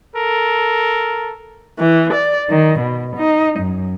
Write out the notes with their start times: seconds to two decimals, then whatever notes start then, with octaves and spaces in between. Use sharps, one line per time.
0.15 A4 A#4
1.80 E3
2.13 D5
2.49 D#3
2.79 B2
3.16 D#4
3.59 F#2